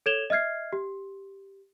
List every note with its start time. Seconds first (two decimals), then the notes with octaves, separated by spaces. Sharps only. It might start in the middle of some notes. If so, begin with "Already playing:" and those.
0.06 A4 C#5 G#6 E7 F7 G7
0.30 D#5 E5 F6 G#6 C7
0.73 G4